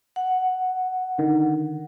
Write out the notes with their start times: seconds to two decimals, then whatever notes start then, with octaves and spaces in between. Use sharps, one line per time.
0.16 F#5
1.18 D3 D#3